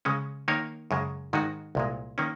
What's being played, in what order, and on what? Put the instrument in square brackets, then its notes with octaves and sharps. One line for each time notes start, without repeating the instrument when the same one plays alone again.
[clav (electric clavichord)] C#3 G#3 C#4
D#3 A#3 D#4 A#4 C#5
F#2 C#3 G#3
G#2 D#3 G#3 D#4 F#4
C2 A#2 G#3
D#3 A#3 C#4